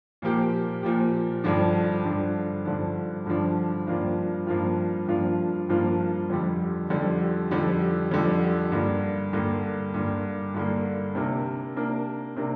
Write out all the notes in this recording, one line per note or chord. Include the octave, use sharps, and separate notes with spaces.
A#2 F3 A#3 G4
A#2 F3 A#3 G4
G2 D3 F3 D4
G2 D3 F3 D4
G2 D3 F3 D4
G2 D3 F3 D4
G2 F3 A#3 D4 F4
G2 F3 A#3 D4 F4
G2 F3 A#3 D4 F4
G2 F3 A#3 D4 F4
F2 D3 G3
F2 D3 G3
F2 D3 G3
F2 D3 G3
G2 D3 A#3
G2 D3 A#3
G2 D3 A#3
G2 D3 A#3
C3 A#3 D4 A#4
C3 A#3 D4 A#4
C3 A#3 D4 A#4